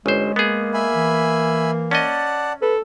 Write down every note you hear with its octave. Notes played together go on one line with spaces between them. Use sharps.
G1 G#3 C#4 C5
A#3 B3 G#4
E5 G#5 B5
E3
C#4 D5 D#5 F#5 A5
A4 B4